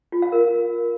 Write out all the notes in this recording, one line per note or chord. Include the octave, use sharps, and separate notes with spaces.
F4
F5
A#4